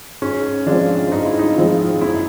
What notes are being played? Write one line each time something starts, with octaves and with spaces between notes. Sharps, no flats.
G#2 C#4
F3 G#3 C4 D4 F4
G#2 D#4
E4
D#4
F3 G#3 C4 F4
F#2 E4